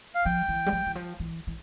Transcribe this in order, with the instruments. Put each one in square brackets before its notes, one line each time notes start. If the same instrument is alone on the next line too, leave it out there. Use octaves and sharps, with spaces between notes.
[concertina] F5
[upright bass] F3 [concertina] G5
[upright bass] E3
G3
F3
E3
F3
E3
E3